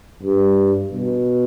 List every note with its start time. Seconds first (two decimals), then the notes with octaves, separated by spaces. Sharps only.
0.23 G2
0.92 B2